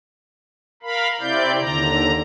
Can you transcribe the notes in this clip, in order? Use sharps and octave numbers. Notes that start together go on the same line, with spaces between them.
A#4 F5 B5
C3 C4 E4 D5 G6
D#2 D3 A#5